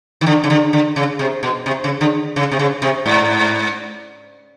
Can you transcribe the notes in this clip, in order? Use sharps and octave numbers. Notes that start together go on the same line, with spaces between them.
D#3
D3
C#3
D3
D3
C#3
C3
B2
C3
C#3
D3
C#3
C3
C#3
C3
G#2